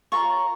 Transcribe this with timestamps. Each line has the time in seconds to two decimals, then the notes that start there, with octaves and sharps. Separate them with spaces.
0.12 F4 A#4 C#5 A#5 C#6